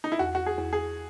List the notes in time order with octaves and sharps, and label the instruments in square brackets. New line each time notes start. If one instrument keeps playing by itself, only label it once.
[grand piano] D#4
E4
[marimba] E2 [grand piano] F#4
[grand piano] F#4
G#4
[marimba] E2
[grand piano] G#4